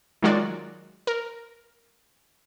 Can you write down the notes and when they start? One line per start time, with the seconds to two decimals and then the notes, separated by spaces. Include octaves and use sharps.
0.22 D#3 F#3 G#3 F4 F#4 D5
1.07 A#4